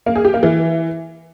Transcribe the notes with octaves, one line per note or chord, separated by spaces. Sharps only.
A#3
G#4
G4
A#3
E3